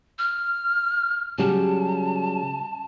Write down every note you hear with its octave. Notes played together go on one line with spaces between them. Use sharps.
F6
C#3 F#3 G3 A5